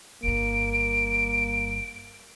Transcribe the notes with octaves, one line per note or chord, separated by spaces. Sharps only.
G1 G2 A#3 D7